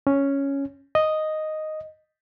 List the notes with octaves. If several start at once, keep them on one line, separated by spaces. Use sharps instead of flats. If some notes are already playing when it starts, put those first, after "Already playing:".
C#4
D#5